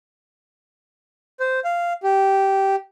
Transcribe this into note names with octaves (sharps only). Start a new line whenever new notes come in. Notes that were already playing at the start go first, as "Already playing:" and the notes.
C5
F5
G4